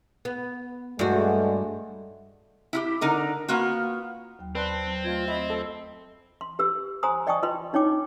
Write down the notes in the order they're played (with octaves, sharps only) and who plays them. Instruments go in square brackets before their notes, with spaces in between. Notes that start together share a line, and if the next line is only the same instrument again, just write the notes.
[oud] B3
[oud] G2 F#4 [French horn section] G#3 A3
[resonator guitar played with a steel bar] E4 F4 G4
D3 D#4 A#4
A#3 B3 F4 F#4
[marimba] D#2 F#3 G5
[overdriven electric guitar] C4 [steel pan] B4 [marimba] D5 C6 [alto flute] A5
[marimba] F#3
[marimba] A3 D#5 G#6 [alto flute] F4
[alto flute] D#5 [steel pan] E5 [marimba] B5
[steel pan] A4
[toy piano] C6
G4 B4 E6
C5 G#5 A#5 C6 D#6
D5 D#5 G5 A5 C#6 D#6
F4 B4 D#5 B5 C6
D4 D#4 C#5 G5 D6